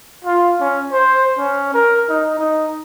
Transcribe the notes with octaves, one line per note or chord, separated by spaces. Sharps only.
F4
C#4
C5
C#4
A#4
D#4
D#4